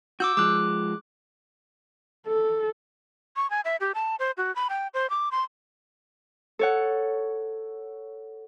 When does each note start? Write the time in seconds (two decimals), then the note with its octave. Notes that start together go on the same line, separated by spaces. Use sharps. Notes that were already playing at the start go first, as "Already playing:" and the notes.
0.20 F#4 D6 E6 G6
0.37 F3 G#3 D6 F#6
2.27 A4
3.36 C#6
3.50 G#5
3.65 E5
3.80 G4
3.95 A5
4.19 C5
4.37 F#4
4.56 B5
4.70 G5
4.94 C5
5.10 D6
5.31 C6
6.59 A4 C#5 F#5